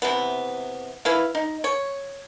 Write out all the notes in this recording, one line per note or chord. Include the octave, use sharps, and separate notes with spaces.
C3 E3 B3
E4 B4 F5
D#4
C#5